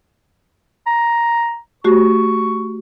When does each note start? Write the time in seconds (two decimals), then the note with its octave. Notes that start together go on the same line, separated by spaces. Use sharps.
0.87 A#5
1.84 A3 F#4 G4 C#6